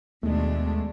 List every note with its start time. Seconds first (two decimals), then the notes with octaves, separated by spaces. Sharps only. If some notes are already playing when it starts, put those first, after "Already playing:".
0.23 D#2 B2 G#3 A3 D4